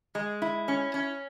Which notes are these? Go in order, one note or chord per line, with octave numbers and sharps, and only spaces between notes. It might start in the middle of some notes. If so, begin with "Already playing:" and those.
G#3
E4
C#4
C#4